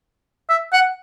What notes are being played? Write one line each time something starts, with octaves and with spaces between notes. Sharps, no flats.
E5
F#5